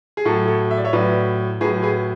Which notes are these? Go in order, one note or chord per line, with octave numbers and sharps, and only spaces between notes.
G#4
A2 F#3 A4
A4
E5
D5
C#5 E5
A2 F#3 B4 D5
A2 F#3 G#4 B4
G#4 B4